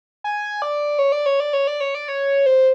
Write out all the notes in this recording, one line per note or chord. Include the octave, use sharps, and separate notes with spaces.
G#5
D5
C#5
D5
C#5
D5
C#5
D5
C#5
D5
C#5
C5